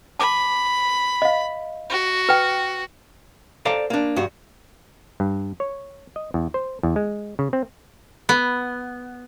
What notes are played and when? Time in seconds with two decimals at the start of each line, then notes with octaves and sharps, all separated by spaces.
0.19 A5 B5 D6
1.22 D#5 F5
1.90 F#4
2.29 B4 G5
3.65 A4 C5 D5 F5 A#5
3.90 A#3 D4
4.16 G2 F#4
5.20 G2
5.60 C#5
6.16 D#5
6.34 E2
6.54 C5
6.83 E2
6.96 G#3
7.39 C#3
7.53 C4
8.29 B3